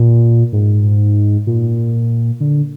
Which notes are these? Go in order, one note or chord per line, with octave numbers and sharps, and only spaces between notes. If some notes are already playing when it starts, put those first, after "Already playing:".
Already playing: A#2
G#2
A#2
D3